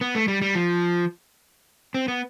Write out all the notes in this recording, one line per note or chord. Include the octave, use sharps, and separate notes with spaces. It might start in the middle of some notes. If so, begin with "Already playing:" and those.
B3
A3
G3
G3
F3
C4
B3